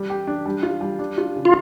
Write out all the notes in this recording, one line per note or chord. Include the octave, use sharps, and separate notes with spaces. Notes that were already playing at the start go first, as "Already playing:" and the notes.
Already playing: G3
G4
D4
G3
F4
G3
D4
F4
C#3
F4